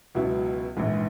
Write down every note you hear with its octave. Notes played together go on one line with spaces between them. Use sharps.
C#2 B2 F#3 B3 E4
A#1 G#2 E3